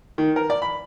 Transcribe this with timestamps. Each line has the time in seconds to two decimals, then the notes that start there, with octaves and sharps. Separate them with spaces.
0.18 D#3
0.36 A#4
0.50 D5
0.62 B5